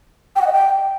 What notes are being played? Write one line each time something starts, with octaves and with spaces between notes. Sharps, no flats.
G5
F#5
D#5
G5